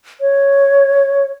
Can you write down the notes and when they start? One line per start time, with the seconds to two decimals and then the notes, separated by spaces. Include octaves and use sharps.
0.21 C#5